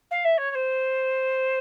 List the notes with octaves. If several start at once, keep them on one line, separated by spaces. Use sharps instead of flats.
F5
E5
C#5
C#5
C5